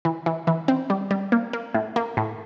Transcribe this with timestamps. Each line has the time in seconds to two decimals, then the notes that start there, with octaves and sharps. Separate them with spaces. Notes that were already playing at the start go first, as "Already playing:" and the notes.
0.05 E3
0.26 E3
0.47 E3
0.68 C4
0.90 G3
1.11 G3
1.32 A#3
1.53 A#3
1.74 A2
1.96 A#3
2.17 A2